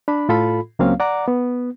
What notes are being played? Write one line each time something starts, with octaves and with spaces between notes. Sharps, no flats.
D4 B5
A2 F4 A4 B5
C#2 F#3 A#3 C4 C#4 F5
D5 F#5 A#5 D6
B3